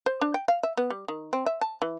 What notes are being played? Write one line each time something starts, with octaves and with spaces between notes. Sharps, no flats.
C5
D4
G5
F5
E5
B3
G3
D#3
C4
E5
A5
E3